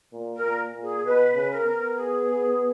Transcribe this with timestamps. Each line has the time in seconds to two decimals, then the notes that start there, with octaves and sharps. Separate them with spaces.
0.13 A#2
0.35 A#4
0.44 A#2
0.75 A#2
0.82 G#4
1.05 B2 B4
1.35 C#3
1.51 A#4
1.65 B3
1.96 G#4